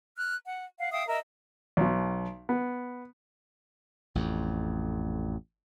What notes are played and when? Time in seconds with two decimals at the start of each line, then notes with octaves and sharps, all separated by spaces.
0.15 F6 F#6
0.44 F#5
0.78 F5 F#5
0.92 E5 F5 G5 D#6
1.08 A#4 D#5 E5
1.77 B1 B2
2.49 B3
4.15 A1 F2